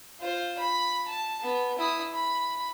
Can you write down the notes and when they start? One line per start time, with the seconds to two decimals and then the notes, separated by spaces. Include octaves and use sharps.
0.20 F4 C5
0.59 B5
1.08 A5
1.43 B3
1.79 E4 D#6
2.13 B5